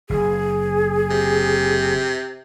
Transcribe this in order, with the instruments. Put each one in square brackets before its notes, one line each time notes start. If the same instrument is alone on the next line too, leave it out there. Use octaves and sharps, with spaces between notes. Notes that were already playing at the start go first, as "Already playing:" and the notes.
[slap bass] F#1 [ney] G#4
[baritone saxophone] C3